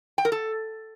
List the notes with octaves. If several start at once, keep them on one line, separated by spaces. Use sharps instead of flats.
G5
A#4
A4